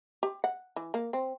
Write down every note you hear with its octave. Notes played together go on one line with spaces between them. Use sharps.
G4
F#5
E3
A#3
C4